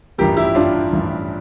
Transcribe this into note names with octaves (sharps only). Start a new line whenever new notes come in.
A1 G2 F3 G4 A#4
E4 G4
A1 G2 F3 D4 F4
A1 G2 F3